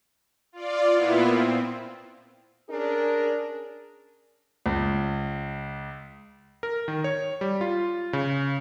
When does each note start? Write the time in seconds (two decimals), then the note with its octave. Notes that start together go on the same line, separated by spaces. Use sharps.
0.52 F4 D5
0.93 A#2 B3 E4 F4
1.27 C4
2.69 C#4 D4 G#4 A#4
4.66 C#2
6.63 A#4
6.88 D#3
7.04 C#5
7.41 G3
7.61 F4
8.13 C#3